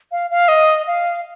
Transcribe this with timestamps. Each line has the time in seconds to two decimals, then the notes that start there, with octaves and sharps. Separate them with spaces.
0.12 F5
0.31 F5
0.48 D#5
0.87 F5